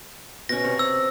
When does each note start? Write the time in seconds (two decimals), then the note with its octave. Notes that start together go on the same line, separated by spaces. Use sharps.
0.49 B2 C#4 A#6
0.64 C3 C#5
0.79 E6